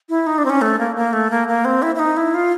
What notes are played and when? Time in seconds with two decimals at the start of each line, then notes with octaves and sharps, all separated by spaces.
0.09 E4
0.27 D#4
0.38 D4
0.45 C4
0.50 C#4
0.61 A3
0.79 A#3
0.96 A#3
1.13 A3
1.30 A#3
1.48 A#3
1.65 C4
1.82 E4
1.95 E4
1.99 D#4
2.17 E4
2.34 F4